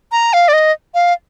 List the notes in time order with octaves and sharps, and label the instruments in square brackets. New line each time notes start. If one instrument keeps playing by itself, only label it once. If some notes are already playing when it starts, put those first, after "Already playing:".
[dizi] A#5
F5
D5
D#5
F5